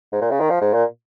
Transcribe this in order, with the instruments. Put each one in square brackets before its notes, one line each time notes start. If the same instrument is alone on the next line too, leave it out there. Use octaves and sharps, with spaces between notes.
[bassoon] G#2
A#2
C#3
D#3
F3
G#2
A#2